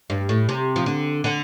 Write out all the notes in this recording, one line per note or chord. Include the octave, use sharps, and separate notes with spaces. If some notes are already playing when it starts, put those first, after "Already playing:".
G2
A2
C3
F3
D3
D3